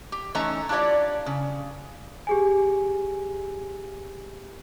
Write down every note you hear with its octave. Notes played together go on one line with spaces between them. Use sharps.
G4
E3 A3 C#4 D#4 A#5
D4 E4 F4 G4 C#5 D5
C#3
G4 G#4 G#5